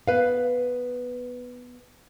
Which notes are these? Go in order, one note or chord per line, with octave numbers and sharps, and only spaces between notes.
B3 B4 F5